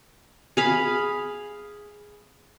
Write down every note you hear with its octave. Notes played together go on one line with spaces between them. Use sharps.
G#4 F5 B5